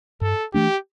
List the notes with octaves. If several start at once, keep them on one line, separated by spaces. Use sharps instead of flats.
G2 A4
E3 A3 D4 G4